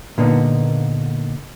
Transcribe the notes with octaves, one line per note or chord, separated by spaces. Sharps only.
A#2 D3 A#3 B3 D#4